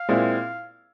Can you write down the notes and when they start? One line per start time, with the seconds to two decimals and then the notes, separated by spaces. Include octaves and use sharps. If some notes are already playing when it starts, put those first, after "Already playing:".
Already playing: F5
0.09 A#2 G#3 C4 E4